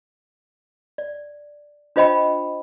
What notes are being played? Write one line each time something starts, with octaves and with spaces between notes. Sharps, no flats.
D5
D4 F4 C5 D#5 G5 B5